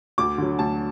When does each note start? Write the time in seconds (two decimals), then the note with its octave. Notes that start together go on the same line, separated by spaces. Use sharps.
0.18 D2 D6
0.38 D3 F#3
0.59 D2 A5